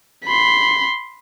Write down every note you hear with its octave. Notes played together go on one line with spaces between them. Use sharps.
B5 C6